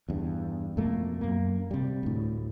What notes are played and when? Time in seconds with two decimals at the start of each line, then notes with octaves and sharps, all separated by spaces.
0.09 E2 G2
0.77 F2 B2 A3 A#3
1.21 F#2 A#3
1.71 C3 G3
2.03 D2 A2